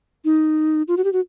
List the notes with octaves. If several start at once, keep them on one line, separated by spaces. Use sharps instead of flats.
D#4
F4
F#4
G4
F#4